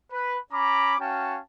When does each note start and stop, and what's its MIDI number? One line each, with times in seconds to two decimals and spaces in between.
0.11 0.38 71
0.53 0.95 61
0.53 0.95 82
0.53 0.95 83
0.53 0.95 86
1.00 1.41 61
1.00 1.41 66
1.00 1.41 77
1.00 1.41 79
1.00 1.41 81